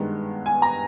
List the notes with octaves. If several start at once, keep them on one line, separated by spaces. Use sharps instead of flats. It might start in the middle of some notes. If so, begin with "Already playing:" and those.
Already playing: G2 D#3 G#3 B3
G#5
A#5